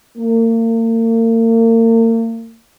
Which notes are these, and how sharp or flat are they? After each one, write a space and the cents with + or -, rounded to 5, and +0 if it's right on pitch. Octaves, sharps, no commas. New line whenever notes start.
A#3 -40